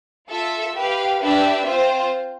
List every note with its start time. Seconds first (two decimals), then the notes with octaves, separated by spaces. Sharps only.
0.29 F4 A4 E5
0.75 G4 B4 F5
1.21 D4 G4 B4 E5
1.66 C4 F4 C5